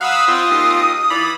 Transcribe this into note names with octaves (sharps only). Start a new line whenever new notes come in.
F#3 F5 F#5 B5 D#6 E6
C4 F4 D#5
D#2
E3 D5 B5